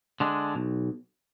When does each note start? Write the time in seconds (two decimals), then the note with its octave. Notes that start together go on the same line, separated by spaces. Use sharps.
0.20 D3 G#3 D4
0.55 B1